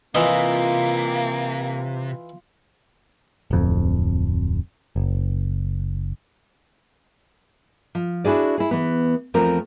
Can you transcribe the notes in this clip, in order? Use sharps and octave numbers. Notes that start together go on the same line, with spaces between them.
C3 E3 A#3 F4 D#5
D1 F2
F#1
F3
D4 E4 F#4 G#4 D5
E4 G#4
E3 B3
E2 F3 A3 C4 A#4